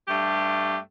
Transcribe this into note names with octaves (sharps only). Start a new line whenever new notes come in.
G2 A3 G4